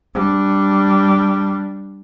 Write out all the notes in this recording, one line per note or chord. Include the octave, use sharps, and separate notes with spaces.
G3 D4